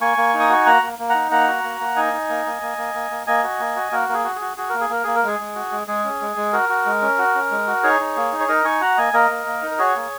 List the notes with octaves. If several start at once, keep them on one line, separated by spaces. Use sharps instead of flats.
A#3 G#5 C#6
A#3
D#4
D#6
F#4 C#6
A#3 F#5 A#5
A#3
A#3
D#4 F#5 A#5
A#3 F#5 A#5
F#4
A#3
A#3
D#4 D#5 G#5
D#4
A#3
A#3
A#3
A#3
A#3
A#3
A#3 D#5 G#5
F#4
A#3
F#4
A#3 F#4 A#4
A#3 G#4 A#4
F#4
G#4
F#4
F#4 G#4
A#3 A#4
G#4
A#3 A#4
A#3 G#4
A#4
G#3 G#4
G#3
F#4
G#3
G#3 G#4
C#4
G#3
G#3
F#4 A#4
F#4
G#3
C#4
F#4
C#4
G#3
F#4
D#4 G#4 C#5
D#4
A#3
D#4
C#5
D#4 A#4 D#5
D#4 G#5 C#6
F#4 F#5 A#5
A#3 D#5 G#5
A#3 A#4 D#5
A#3
A#3
D#4
A#4
F#4 G#4 C#5
A#3